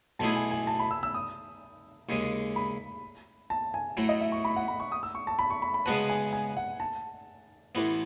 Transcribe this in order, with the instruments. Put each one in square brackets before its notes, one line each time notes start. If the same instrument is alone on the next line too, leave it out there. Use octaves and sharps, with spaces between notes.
[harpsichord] B1 B2 A3 E4 G#4 [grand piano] A5
[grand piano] G#5
G#5
A5
B5
E6
E6
D#6
[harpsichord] D#2 C#3 G#3
[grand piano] B5
A5
G#5
[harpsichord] A2 F#3 A3
[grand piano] D#5
E5
C#6
B5
F#5
B5
C#6
D#6
E6
C#6
A5
B5
C#6
B5
B5
[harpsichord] C#3 G#3 B3 F#4 B4 [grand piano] A5
[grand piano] G#5
G#5
F#5
A5
[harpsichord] A1 A2 E3 B3